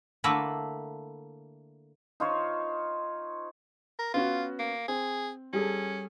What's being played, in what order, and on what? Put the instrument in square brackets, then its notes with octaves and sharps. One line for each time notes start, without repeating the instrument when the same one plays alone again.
[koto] D3 A3 A#3 E4 B4
[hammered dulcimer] D#4 F4 C5 C#5
[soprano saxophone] A#4
[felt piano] B3 C#4 F#4 [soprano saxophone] F4
[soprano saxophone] A#3
[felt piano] C4 [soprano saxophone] G#4
[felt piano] G3 G#4 A4 [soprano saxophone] C#4